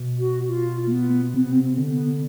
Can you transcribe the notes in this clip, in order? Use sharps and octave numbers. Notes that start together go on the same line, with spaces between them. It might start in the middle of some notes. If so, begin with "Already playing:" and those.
Already playing: B2
F#4
F4
A#3
B3
C3 C4
B3
C4
D3
B3